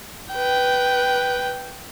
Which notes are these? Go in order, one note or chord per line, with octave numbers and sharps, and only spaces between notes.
B4 G5